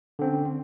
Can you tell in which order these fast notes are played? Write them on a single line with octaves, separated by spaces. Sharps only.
D3 C4 C#4